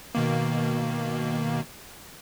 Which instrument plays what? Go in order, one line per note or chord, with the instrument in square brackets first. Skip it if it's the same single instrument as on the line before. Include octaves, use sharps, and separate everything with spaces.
[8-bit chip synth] B2 D#3 A#3